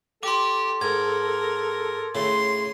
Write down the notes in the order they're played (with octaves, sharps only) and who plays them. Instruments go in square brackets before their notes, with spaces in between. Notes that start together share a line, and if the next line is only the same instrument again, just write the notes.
[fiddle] G4 [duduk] A4 [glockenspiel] C6 D6
[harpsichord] G#2 [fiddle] A#4 [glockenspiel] G#6
[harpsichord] A2 C#3 [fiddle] C6